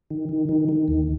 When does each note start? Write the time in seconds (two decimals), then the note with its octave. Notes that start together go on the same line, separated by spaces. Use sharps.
0.10 D#3
0.29 D#3
0.49 D#3
0.69 D#3
0.88 D#2